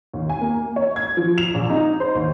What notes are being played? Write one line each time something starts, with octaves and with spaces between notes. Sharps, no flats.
D#2
G#5
A#3
C#5
G#6
F3
F7
A#1
D#4
C5
D#2